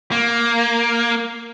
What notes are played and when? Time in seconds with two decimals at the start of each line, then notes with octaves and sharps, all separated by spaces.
0.12 A#3